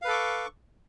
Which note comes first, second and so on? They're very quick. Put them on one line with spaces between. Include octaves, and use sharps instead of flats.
F5 B4 A4 D6 C#6